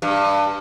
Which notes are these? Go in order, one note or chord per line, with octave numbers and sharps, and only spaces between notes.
G2